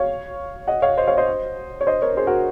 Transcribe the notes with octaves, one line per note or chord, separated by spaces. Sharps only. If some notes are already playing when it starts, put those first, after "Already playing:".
Already playing: C#5 F5
D#5 F#5
C#5 F5
C5 D#5
C#5 F5
C5 D#5
C#5
C5 D#5
A#4 C#5
G#4 C5
F#4 A#4